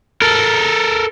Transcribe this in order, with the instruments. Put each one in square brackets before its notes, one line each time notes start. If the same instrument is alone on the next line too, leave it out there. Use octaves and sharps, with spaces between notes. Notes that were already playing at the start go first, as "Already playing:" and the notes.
[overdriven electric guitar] A4 A#4